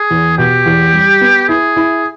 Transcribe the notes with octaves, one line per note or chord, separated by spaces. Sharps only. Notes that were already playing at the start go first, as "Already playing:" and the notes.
Already playing: G#4
E2
B2 G4
E2
G3
B3
E4 G#4
E4